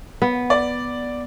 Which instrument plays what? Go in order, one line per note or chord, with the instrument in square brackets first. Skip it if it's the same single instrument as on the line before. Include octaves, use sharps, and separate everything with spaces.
[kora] B3
[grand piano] D5